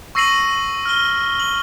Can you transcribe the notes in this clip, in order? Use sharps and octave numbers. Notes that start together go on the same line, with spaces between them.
C#6 E6 A#6 C7 D#7 F#7
F6 G7
F#7